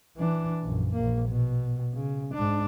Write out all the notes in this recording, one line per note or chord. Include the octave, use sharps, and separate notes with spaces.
E3 D4
A#1 F#2
A#1 A#3
B2
C#3
G#2 D4